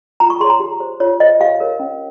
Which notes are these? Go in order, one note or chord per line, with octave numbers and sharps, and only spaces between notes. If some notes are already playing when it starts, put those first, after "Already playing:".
F4 A#5
C#6
G#4 C#5 C6
A#5
G4
C5
F4 C#5
C5 D#5
G4 F5
A#4 C#5
C#4